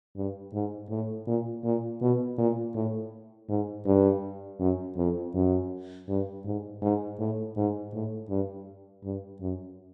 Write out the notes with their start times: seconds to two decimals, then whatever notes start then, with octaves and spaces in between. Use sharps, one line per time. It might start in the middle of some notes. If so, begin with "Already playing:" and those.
0.16 G2
0.53 G#2
0.90 A2
1.27 A#2
1.64 A#2
2.02 B2
2.38 A#2
2.75 A2
3.49 G#2
3.87 G2
4.60 F#2
4.97 F2
5.35 F#2
6.09 G2
6.45 G#2
6.82 G#2
7.19 A2
7.57 G#2
7.93 A2
8.30 G2
9.04 G2
9.41 F#2